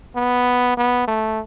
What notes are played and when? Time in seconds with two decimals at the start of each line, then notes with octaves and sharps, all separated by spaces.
0.16 B3
0.77 B3
1.08 A3